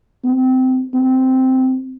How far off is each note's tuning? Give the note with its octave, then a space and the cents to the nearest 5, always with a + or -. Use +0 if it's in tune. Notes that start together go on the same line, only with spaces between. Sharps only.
C4 -20
C4 -5